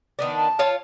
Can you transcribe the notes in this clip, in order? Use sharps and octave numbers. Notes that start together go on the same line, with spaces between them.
D#3 B3 D4
A5
F4 C#5 F5